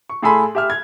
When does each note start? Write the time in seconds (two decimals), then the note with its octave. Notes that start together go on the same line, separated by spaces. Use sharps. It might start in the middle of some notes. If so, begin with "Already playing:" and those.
0.10 C#6
0.22 A2 G#4 A4 G#5 B5 C6
0.55 G4 E5 F6
0.70 G#6